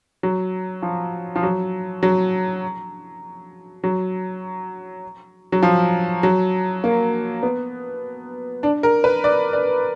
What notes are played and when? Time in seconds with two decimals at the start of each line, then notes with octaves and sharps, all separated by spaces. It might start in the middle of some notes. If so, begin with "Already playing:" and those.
0.23 F#3
0.82 F3
1.36 F3
1.43 F#3
2.03 F#3
3.84 F#3
5.52 F#3
5.63 F3
6.23 F#3
6.84 A#3
7.43 B3
8.63 D4
8.83 A#4
9.04 B4
9.24 D5
9.53 D5